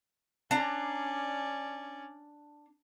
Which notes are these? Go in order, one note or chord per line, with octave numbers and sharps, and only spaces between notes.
C#4 D4 D5 A#5